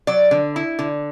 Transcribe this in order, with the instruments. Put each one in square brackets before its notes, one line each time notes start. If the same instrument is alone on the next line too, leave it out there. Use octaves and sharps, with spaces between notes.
[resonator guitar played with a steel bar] F#3 D5
D3
E4
D3